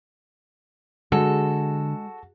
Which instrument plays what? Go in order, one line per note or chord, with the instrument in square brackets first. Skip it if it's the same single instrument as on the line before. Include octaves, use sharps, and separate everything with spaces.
[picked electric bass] D3 [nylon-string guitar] G#3 [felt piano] F#4 [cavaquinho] A4